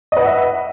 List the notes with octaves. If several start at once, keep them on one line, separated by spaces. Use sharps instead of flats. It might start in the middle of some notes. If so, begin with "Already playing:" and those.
B4 D#5 E5 F#5